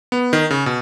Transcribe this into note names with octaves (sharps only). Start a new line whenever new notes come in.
B3
D#3
C#3
B2